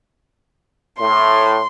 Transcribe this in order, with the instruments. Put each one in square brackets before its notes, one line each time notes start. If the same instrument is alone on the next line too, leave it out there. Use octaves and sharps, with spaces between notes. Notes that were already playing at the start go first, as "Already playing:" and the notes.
[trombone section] A2 [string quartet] C6